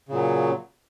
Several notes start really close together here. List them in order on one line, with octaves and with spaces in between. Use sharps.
C#3 A#2 F#3